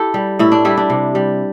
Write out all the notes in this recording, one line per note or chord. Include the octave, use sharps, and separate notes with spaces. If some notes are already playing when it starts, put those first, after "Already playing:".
Already playing: E4 G4 A4
G3
A2 E4
D4
G3 E4
D4
C3
G3